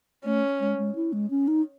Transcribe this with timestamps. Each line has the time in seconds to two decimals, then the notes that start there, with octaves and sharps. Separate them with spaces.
0.25 A3 C#4
0.60 G#3
0.78 G#3
0.95 E4
1.13 G#3
1.30 C#4
1.48 D#4